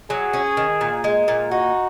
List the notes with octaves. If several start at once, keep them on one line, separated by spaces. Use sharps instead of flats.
F#3 G#4
C#4
D#3
A#2
G#3
A#2
D#4 F#4